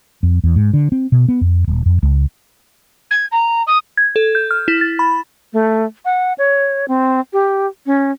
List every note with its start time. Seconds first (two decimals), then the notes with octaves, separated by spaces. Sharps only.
0.23 F2
0.43 E2
0.56 G#2
0.73 D3
0.92 C4
1.12 B2
1.28 B3
1.41 F2
1.68 D#1
1.86 F2
2.03 C#2
3.11 G#6
3.32 A#5
3.67 D#6
3.97 G#6
4.16 A4
4.35 G6
4.51 F6
4.68 E4
4.81 A6
4.99 B5
5.53 A3
6.05 F#5
6.38 C#5
6.88 C4
7.33 G4
7.86 C#4